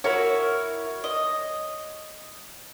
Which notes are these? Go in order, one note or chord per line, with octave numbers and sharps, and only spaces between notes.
E4 F#4 A#4 C#5
D#5